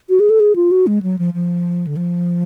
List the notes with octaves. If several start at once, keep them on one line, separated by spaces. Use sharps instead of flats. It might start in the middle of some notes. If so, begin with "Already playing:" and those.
F#4
G#4
A4
G#4
F4
F#4
G#3
F#3
F3
F3
D3
F3